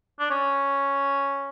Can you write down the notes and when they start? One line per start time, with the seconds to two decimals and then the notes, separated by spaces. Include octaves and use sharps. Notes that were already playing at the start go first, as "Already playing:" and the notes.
0.20 D4
0.31 C#4